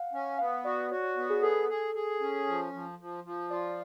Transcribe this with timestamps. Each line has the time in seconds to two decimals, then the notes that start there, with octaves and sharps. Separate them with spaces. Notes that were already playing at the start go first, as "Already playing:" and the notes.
Already playing: F5 F#5
0.13 C#4
0.38 B3 F5
0.65 F#4 D5
0.91 F#4 C#5
1.03 C#5
1.17 B3
1.30 G#4
1.42 G#4 A4
1.69 G#4
1.95 G#4
2.20 C#4
2.47 F3
2.73 F3
2.99 F3
3.24 F3
3.50 F4 D5